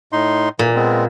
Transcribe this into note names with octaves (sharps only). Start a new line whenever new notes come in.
A2 D#4 C6
A#2 E3
G#3 B3 C4